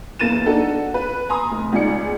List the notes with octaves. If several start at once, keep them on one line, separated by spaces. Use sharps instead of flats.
F#1 E2 A#3 A6 D#7 E7
A#3 D4 D#4 F#4 A4
B4
G#5 A#5 C6 D#6
F1
C#2 F3 D#4 G#4 D5 C#7